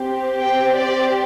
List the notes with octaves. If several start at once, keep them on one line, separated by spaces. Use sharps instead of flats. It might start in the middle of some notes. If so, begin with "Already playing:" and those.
Already playing: C4 G4
G5
D5